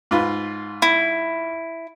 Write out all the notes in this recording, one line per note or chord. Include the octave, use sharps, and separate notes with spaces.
G#2 F4 B4
E4